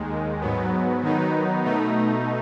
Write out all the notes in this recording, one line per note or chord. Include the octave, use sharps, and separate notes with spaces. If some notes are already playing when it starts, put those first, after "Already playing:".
Already playing: D#2 D#3 G#3
G#2 F#3 B3
D#3 F#3 B3 D#4
B2 A3 D#4